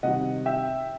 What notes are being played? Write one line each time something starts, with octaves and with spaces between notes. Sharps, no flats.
C3 D#3 G3 D#5 F#5
E5 G5